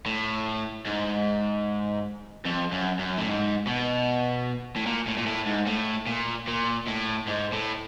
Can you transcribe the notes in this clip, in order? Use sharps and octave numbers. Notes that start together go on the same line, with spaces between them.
A2
G#2
F2
F#2
F#2
A2
G#2
B2
A2
A#2
A2
A#2
A2
G#2
A2
A#2
A#2
A2
G#2
A2